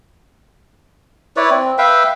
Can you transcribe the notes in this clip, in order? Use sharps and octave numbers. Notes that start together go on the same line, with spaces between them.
E4 B4 C#5 D5
C4
B4 E5 F5 G5